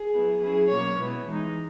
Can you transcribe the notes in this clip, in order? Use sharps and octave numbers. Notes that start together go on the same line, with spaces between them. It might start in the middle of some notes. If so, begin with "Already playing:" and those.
Already playing: G#4
F#3 B3 E4
F#3 C#4 E4 G#4
B2 F#3 A#3 C#4 C#5
B2 G#3 B3 E4
E3 G#3 D#4